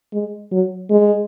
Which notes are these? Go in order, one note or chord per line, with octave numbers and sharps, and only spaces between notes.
G#3
F#3
G#3